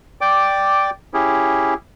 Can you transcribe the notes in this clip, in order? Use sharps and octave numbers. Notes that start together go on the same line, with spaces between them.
D5 G5 D6
C#4 E4 G4 G#4